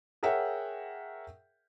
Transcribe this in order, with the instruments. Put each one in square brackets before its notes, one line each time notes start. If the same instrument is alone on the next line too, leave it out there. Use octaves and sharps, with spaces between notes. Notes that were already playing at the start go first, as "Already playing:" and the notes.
[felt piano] G#4 A#4 C#5 E5 F#5 G5